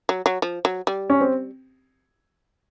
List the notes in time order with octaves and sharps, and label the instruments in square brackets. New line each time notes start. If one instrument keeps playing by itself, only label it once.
[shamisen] F#3
F#3
F3
F#3
G3
[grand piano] C#4
C4